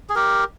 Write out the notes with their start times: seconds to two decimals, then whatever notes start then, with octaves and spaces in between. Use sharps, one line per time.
0.10 G#4
0.16 G4 A#4